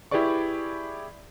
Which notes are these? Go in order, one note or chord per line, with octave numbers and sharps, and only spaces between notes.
E4 G4 G#4 B4 D5 C#6